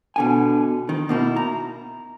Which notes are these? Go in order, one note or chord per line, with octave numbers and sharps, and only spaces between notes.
B2 D3 G#5
D#3
B2 A#3 D#4 E4
A#5